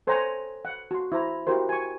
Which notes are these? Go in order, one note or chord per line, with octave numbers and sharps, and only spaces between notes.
A4 C5 C#5 F#5 G#5 A#5
F#5
F#4 C6
E4 C5 A#5
E4 F#4 G4 A#4 C5
G#5 C#6